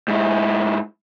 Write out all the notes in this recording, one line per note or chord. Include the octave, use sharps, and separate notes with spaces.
G#2 E4